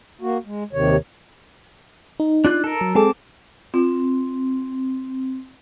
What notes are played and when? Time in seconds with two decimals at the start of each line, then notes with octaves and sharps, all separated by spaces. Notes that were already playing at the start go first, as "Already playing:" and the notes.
0.21 A#3 F#4
0.46 G#3
0.73 D#2 C3 D#3 C#5
2.20 D#4
2.45 D4 F4 F#6
2.64 A4 A#4
2.81 F#3
2.95 G#3 C4 G#4 A4 A5 D6
3.74 C4 F4